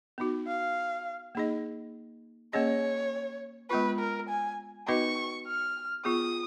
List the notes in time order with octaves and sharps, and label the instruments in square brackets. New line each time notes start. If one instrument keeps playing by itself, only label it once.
[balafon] B3 D#4 F#4
[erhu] F5
[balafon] A#3 D#4 G#4 D#5
[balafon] A#3 C#4 G#4 D#5 [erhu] C#5
[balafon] G#3 B3 F4 [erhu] B4
[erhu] A#4
G#5
[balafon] B3 D#4 F#4 B4 D#5 [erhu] C#6
[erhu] F6
[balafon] B3 F4 G#4 [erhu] D#6